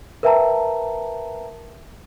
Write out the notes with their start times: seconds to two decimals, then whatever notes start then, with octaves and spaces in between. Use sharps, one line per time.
0.23 A#4 B4 E5 G5 A5 A#5